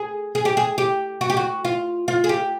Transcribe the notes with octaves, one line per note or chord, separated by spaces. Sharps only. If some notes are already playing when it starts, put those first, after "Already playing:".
Already playing: G#4
G#4
G4
G#4
G4
F#4
G4
F#4
F4
F4
G#4
G4